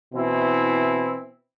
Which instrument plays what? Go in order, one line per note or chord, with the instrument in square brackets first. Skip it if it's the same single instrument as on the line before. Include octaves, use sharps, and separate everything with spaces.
[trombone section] B2 E3 C4 E4